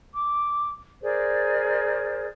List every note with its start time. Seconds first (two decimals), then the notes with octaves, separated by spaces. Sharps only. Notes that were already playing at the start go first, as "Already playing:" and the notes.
0.15 D6
1.03 G#4 A#4 C5 D5